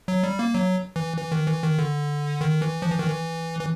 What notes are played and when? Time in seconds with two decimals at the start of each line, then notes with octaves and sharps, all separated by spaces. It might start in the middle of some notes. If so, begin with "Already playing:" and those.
0.08 F#3
0.23 G3
0.39 A#3
0.54 F#3
0.96 E3
1.17 E3
1.32 D#3
1.47 E3
1.63 D#3
1.79 D3
2.41 D#3
2.62 E3
2.82 F3
2.91 E3
2.99 D#3
3.07 E3
3.60 E3